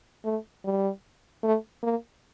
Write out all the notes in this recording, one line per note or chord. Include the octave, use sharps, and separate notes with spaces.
A3
G3
A3
A#3